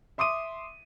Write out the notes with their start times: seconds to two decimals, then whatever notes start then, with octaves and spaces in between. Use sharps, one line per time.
0.18 E5 C6 D6 D#6 D#7